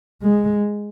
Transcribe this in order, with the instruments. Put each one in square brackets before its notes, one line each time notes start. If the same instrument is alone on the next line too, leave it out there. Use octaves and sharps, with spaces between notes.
[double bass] G#3